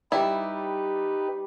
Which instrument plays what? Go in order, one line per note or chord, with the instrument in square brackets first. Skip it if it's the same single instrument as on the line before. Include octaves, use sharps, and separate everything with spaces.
[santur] G3 D5 [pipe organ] D#4 G4 B4 [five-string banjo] E4